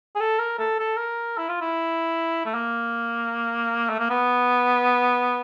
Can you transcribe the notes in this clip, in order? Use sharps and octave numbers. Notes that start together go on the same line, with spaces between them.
G#4
A4
A#4
A4
A4
A#4
E4
F4
E4
A3
A#3
A3
A#3
B3